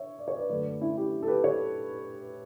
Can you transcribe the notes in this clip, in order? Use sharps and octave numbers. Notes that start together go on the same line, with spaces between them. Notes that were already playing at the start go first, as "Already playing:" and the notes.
Already playing: C#5 E5
D5
C#5
B4 D5
F#2 D3 A3 B4 D5
C#4 E4
E4 G4
A4
G4 B4
A4 C#5